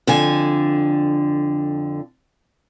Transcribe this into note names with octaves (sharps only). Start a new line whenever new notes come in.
F2 D3 G#5